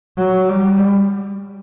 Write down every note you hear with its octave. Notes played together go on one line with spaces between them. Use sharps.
F#3
G3